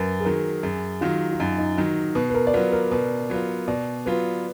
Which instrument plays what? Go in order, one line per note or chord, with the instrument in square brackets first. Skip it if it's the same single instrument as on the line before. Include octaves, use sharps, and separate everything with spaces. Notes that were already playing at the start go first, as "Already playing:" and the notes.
Already playing: [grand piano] F#2 [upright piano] A#4 B4
[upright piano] G#4
[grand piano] D#3 F#3 [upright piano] A#4
[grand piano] F#2 [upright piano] G#4
[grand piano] D#3 F#3 [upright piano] F4
[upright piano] F4
[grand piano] F#2 [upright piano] D#4
[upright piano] D#4
[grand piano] D#3 F#3 [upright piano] D#4
[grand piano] B2 [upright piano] B4
[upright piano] B4
A#4
D5
[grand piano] F#3 B3 F4 [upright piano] B4
[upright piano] A#4
[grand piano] B2 [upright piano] B4
[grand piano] F#3 B3 F4
[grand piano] B2 [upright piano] D5
[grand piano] F#3 B3 F4 [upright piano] B4